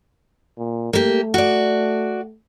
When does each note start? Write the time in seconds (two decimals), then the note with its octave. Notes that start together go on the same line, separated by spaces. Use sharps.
0.58 A#2
0.93 A3 A#3 G4
1.34 F#4 D5